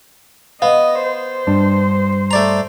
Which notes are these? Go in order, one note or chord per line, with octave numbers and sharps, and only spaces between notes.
B3 D#5 F5
C5
G2 D4
A3 D5 A#5